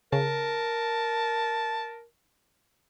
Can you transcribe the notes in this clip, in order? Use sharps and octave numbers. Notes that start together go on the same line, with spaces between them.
C#3 A#4 A5